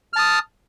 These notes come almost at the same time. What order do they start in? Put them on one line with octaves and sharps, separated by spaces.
F6 A5 D#6